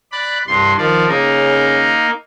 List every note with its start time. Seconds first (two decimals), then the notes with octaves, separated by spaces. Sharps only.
0.12 D5 B5 F#6
0.47 C2 G2 C6
0.77 D#3 F3 D5
1.08 C#3 A#3 D#4 A#4